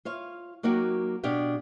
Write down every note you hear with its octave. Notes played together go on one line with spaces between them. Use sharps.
F4 C#5 F5
F#3 A#3 D#4 F#4 G4
B2 D4 G4 F5